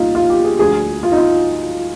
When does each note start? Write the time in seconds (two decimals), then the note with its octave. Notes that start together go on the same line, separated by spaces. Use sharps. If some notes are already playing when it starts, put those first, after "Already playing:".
Already playing: C2 A#2 F3 D#4 F4
0.15 F4
0.30 G4
0.45 G#4
0.59 D2 D3 F3 G#4
1.03 F4
1.12 D#4
1.18 F4